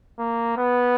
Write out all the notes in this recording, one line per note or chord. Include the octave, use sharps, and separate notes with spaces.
A#3
B3